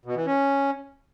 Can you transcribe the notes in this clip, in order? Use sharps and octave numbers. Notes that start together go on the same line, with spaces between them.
B2
E3
C#4